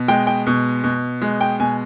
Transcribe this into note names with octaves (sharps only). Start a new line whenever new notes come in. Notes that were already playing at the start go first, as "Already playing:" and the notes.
Already playing: B2
G#3 G5
G5
B2
B2
G#3
G5
B2 G#5